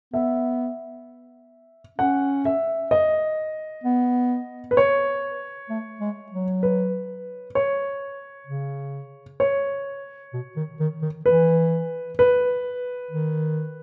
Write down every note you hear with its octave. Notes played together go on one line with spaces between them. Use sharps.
B3 E5
C#4 F#5
E5
D#5
B3
B4
C#5
A3
G#3
F#3
B4
C#5
C#3
C#5
B2
D#3
D#3
D#3
E3 B4
B4
D#3